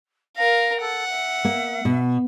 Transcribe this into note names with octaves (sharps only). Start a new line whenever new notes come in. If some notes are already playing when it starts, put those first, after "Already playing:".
A#4 F5 A#6
A4 F#5
E5
A#3
B2